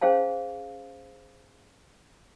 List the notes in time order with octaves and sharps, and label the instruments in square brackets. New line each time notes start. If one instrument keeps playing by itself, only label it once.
[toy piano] C#4 G#4 C5 F5 A5